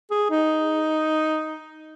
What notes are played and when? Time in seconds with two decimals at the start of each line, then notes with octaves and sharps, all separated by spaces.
0.11 G#4
0.30 D#4